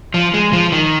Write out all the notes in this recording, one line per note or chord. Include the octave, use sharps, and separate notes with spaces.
F3
G#3
F3
D#3